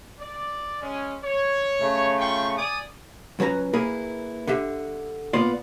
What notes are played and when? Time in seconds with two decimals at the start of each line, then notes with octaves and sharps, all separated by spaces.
0.19 D5
0.81 G#3 C#4
1.23 C#5
1.80 C#3 A3
2.18 F4 G5 C#6
2.57 D5 G#5 D#6
3.39 C#2 F#3 C#4 B4 A#5
3.73 A#3 E4 G#4 A#4 B4
4.47 D3 G4 E5
5.33 A#2 A#3 B3 F4 D5 C6